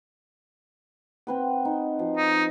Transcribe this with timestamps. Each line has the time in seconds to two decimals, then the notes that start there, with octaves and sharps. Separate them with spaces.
1.27 C4 B4 F#5
1.65 D#4
1.99 F3
2.17 D#4